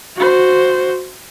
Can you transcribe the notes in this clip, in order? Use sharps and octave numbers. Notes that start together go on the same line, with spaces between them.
F#4 C5